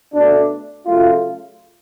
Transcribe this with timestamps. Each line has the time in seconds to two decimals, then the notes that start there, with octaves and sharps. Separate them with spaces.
0.14 B2 A3 D4
0.86 C#3 F#3 A3 F4